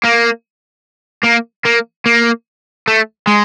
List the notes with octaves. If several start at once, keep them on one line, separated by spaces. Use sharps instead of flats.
A#3
A#3
A#3
A#3
A3
G#3